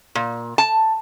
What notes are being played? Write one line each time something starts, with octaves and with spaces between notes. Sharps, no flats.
A#2
A5